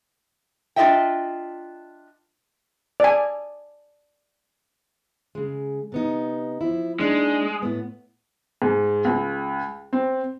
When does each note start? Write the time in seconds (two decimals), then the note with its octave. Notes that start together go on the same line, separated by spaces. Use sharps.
0.76 D4 F4 G#4 D#5 E5 G5
3.00 D5 G#5
5.35 C#3 G#3
5.92 C3 B3 D#4
6.61 F3 E4
6.99 G#3 A#3 D4 D#4
7.62 A2 B3
8.62 G#2
9.05 C#2
9.93 C4